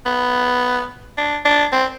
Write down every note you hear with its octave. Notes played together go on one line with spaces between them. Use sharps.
B3
D4
D4
C4